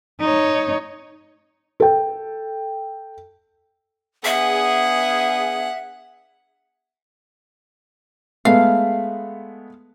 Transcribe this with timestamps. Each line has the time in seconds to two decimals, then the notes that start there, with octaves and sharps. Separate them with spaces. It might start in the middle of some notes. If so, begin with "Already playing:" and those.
0.20 D#4 C#5
1.80 A4 G5
4.25 B3 D4 G#4 E5 F#5
8.45 G#3 A3 B3 F5